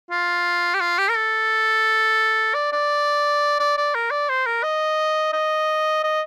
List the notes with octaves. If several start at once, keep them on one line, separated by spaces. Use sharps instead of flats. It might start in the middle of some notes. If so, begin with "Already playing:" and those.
F4
G4
F4
G4
A#4
A4
D5
D5
D5
D5
A#4
D5
C5
A#4
D#5
D#5
D#5